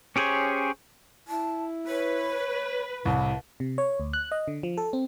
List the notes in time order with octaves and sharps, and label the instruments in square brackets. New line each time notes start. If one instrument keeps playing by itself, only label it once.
[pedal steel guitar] C#4 G4 G#4 C5 C#5
[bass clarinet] E4 [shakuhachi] A5
[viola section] B4 [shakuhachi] C#5
[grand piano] C2 [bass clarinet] A2 [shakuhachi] A5
[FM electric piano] C3
C#5
D2
F#6
D#5
D3
F3
A4
C4